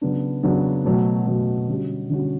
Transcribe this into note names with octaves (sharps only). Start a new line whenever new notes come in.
C#3 F#3 B3 D4
C#3 F#3 B3 D4
B2 F#3 A3
B2 F#3 A3
D3 G3 C#4 F#4
D3 G3 C#4 F#4